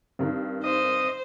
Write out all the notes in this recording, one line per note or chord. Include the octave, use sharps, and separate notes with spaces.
G2 D#3 C4
C5 D#5